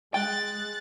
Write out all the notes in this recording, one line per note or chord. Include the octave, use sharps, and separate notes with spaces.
G#3 G5 F#6 A6